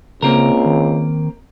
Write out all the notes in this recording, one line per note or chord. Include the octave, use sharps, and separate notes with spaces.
C#2 C#3 A#3 C4 A#4
D#3